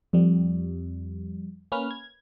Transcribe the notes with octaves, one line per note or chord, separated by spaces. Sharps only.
F2 G3
A#3 C#4 B4 F6
G#6